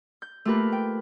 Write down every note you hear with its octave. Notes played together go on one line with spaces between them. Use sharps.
G6
A3 A#3 F4 G4 A#4 B4
G5